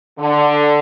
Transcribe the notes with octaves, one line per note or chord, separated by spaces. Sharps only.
D3